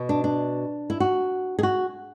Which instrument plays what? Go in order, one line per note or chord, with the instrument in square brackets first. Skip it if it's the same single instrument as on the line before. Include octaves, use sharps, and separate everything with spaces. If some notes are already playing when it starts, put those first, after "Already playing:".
Already playing: [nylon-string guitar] B2
D4
D4
E4
F#4
G#4
F#4